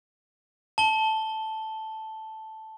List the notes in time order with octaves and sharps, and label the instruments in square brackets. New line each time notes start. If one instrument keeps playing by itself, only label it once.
[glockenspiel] A5 G7